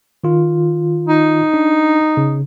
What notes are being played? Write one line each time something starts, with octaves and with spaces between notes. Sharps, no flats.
D#3 F4
D#4
D4
C#3